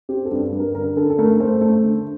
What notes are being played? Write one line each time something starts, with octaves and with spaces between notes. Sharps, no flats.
C4 G4
A4
G2
G2
A#4
D3 A#4
D3 A4
A4
A3 A#4
A3 C5
A3
D3